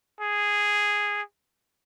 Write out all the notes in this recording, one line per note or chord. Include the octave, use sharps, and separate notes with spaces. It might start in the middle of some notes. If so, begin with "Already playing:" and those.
G#4